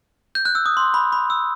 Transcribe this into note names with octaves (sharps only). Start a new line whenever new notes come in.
G6
F#6
E6
D#6
C6
B5
B5
E6